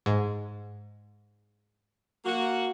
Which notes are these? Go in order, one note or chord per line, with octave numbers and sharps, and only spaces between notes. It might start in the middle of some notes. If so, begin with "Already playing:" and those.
G#2
A#3 F#4